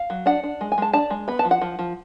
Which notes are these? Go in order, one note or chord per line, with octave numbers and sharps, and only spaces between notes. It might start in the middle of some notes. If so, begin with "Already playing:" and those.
Already playing: F5
F#3
D4 F#5
D4
G#3
G#5
G#3 A5
D4 A5
G#3
B3 B5
A5
F3
F#5
F3
F3